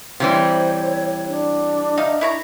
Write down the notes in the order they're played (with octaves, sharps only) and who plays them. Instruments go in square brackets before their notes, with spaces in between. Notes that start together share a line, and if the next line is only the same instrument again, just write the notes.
[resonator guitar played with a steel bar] C3 E3 G3 [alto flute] C5 [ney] C#5
[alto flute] D4
[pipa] D#4 F5 [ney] E5
[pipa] E4 C#5 A#5